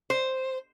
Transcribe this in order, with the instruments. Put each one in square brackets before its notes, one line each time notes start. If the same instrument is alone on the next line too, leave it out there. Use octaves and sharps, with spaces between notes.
[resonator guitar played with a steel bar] C5